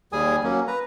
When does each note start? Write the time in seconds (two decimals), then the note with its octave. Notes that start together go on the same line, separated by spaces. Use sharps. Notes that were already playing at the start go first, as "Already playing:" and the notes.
0.13 D#2 G3 G#4 G#5 D#6
0.44 F#3 A#3 C#4
0.67 B4 A#5